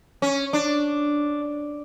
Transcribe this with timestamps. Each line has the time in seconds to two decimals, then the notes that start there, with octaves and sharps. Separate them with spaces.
0.22 C#4
0.53 D4